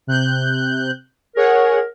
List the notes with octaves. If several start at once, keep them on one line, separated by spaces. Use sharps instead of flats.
C3 F#6 G6
G#4 A#4 C#5 F#5